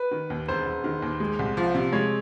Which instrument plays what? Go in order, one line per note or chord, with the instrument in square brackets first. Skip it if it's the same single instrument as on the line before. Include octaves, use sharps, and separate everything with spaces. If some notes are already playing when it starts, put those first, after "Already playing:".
Already playing: [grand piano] B4
[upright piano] D#3
D#2
[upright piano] E1 [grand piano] C5
[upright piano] E1
D#3
D#2
G#3
C2
F3
C3
[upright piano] G#3 [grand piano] C#5